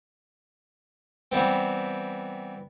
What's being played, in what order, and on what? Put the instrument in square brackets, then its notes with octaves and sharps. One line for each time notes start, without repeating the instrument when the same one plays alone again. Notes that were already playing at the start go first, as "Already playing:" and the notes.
[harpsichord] E3 G3 B3 C4